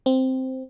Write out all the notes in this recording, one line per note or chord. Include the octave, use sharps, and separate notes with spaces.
C4